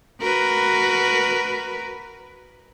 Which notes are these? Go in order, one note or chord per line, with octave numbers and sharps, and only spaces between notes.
F#4 A#4 B4